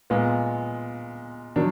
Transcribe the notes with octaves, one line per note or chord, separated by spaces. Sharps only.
A#2 G#3 B3 F4
D#3 F#3 D4